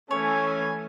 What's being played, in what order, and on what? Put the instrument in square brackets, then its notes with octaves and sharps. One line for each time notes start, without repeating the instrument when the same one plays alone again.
[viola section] E3 A3 [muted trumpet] C#4 [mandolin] C#5 [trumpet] G#5